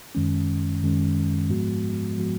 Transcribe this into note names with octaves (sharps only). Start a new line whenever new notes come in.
F#2 D#3 G#3 C#4
F#2 D#3 G#3 C#4
G#2 F3 G#3 B3 F#4
F3 G#3 B3 F#4